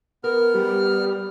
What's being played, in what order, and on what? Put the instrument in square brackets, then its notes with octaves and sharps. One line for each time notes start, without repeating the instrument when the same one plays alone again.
[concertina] B3 F6 [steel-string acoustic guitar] A#4
[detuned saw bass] G3 [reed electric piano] G4